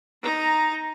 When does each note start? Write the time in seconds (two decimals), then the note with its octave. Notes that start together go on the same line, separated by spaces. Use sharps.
0.22 D#4 A#5